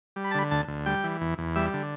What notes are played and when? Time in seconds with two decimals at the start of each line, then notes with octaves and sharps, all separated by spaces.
0.16 G3
0.24 B5
0.31 A5
0.35 D3 B5
0.51 D2 A5
0.68 D2
0.86 G3 G5
1.04 E3
1.21 E2
1.38 E2
1.56 G3 E5
1.74 D3